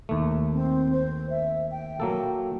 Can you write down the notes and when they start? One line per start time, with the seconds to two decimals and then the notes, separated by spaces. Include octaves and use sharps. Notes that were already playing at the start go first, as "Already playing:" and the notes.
0.09 D#2 A3
0.53 C4
0.92 C5
1.30 E5
1.71 G5
2.00 F#3 A#3 A4